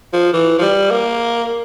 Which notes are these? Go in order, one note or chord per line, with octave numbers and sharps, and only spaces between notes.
F3
E3
F3
G3
A#3